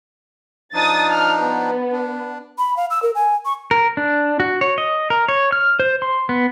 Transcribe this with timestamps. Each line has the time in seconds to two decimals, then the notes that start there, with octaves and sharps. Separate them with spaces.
0.74 F3 D4 D#4 D#6 A6
1.11 F6
1.42 B3
1.92 D4
2.58 B5
2.77 F5
2.90 E6
3.03 A#4
3.15 G#5
3.45 C#6
3.71 A#4
3.97 D4
4.40 F#4
4.61 C#5
4.78 D#5
5.10 A#4
5.28 C#5
5.52 F6
5.80 C5
6.02 C6
6.29 B3